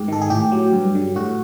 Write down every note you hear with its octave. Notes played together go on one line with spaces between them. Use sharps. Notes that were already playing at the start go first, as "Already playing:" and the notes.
Already playing: G#2 G4
D#3 A4
G#4
A2 G4
F#3
G2
D3
A2 F#4